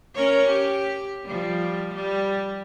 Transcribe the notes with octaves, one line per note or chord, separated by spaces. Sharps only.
C#4 A#4 C#5
G4
F3 G3
G3